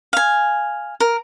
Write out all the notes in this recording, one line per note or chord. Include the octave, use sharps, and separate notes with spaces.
F5 G#5
A#4